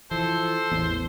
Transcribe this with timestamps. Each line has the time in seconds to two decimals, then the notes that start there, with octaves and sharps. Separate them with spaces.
0.11 E3 F3 A4 C5
0.71 A1 E2